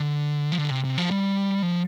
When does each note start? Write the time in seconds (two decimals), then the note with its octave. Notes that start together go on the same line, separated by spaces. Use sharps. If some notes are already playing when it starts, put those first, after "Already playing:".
Already playing: D3
0.52 F3
0.58 D3
0.70 C3
0.84 C3
0.98 F3
1.11 G3
1.62 F3